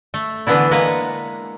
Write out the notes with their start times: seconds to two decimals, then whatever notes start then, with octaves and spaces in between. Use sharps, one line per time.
0.14 A3
0.47 D3 E3 B3 D4 E4
0.71 G#3 A#3 B4 F#5